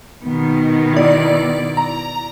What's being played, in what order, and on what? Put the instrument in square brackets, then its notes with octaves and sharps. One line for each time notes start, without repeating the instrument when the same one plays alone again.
[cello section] B2 D#3 B3
[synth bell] E4 D5
A#5